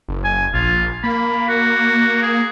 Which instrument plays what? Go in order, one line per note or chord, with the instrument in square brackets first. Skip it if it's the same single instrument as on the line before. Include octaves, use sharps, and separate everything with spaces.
[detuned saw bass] F#1
[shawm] G#5
[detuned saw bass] A#1 [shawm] F4
[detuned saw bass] A#3 [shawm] B5
[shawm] F#4
G#4